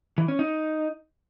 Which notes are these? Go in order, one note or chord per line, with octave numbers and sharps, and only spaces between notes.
E3
C#4
D#4